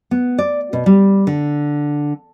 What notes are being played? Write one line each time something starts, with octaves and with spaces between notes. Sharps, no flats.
B3
D5
B2
G3
D3